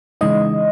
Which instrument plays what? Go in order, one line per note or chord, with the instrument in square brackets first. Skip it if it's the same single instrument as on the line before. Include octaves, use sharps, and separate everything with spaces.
[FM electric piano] C#3 E3 G#3 D#4 D#5